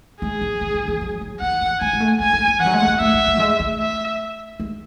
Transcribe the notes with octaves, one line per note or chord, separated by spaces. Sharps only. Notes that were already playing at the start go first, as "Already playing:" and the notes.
G#3 G#4
F#3
E3
D#3
E3
F#3
F#3
D#3 F#5
E3
G#3 G#5
G#3
A3
A3 G#5
A3
G#3
E3 F#5
F#3
G#3
A3
G#3
A3 E5
G#3
A3
F#3
G#3
A3
E5
G#3